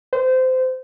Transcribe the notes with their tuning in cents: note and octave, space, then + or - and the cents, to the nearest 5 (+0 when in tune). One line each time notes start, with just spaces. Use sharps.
C5 -25